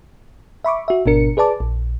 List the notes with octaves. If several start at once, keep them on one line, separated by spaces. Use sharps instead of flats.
E5 B5 C#6 D6
F#4 E5
G#1 B2 D4 A#4 C#7
G#4 B4 D5 A5 D6
A#1